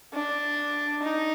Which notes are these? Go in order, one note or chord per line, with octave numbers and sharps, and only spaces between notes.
D4
D#4